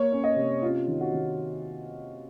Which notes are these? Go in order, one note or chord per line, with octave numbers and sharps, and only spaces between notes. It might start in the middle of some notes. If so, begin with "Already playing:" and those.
Already playing: A#3 C#5
C#4
D#5
C3
C#4 F4
D#3
F#4
D#3